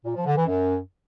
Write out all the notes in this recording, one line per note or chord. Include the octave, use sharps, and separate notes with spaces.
A#2
F3
D3
E3
F#2